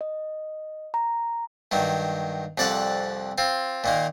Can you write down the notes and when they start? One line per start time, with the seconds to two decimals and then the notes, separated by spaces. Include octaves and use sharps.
0.01 D#5
0.94 A#5
1.71 G2 D#3 F#3
2.58 C2 F2 D5 F#5 A5 C#6
3.38 C4 F4
3.84 A#2 D#3 A#3